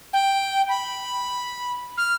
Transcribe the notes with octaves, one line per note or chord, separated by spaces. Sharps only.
G5
B5
F6